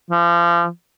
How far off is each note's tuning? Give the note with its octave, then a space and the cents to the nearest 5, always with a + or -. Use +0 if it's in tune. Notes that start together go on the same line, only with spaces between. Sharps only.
F3 -30